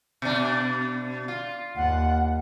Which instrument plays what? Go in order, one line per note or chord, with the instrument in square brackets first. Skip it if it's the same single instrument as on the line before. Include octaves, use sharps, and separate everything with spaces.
[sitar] B2 D4
F4
[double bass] D#2 [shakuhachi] F#5